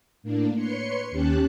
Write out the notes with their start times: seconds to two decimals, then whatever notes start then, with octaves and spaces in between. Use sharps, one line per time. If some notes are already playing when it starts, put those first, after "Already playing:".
0.23 A2 A#3 D4
0.55 B4 C#5 C6 C#7
1.11 D#2 C#4 G4 A5 F#6